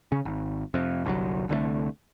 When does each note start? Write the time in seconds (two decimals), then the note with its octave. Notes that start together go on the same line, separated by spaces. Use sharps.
0.12 C#3 C#4
0.25 G#1
0.74 F2 C3
1.05 G1 C2 B2 F#3
1.49 C2 D3 F#3 A3